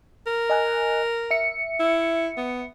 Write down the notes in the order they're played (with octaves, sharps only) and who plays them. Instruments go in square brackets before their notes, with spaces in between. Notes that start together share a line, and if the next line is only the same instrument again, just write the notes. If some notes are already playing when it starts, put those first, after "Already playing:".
[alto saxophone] A#4
[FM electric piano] D#5 G#5 F#6
E5 C#7
[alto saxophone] E4
B3